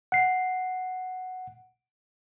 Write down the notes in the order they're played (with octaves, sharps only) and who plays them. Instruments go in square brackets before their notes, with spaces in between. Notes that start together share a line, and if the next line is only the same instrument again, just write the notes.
[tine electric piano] F#5 C7